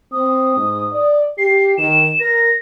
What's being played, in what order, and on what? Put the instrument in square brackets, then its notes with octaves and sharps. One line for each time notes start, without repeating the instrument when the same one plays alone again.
[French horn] C4 [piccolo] D#6
[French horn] G#2
D5
[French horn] G4 [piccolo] C7
[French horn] D#3 [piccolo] E7
[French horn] A#4 [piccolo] A#6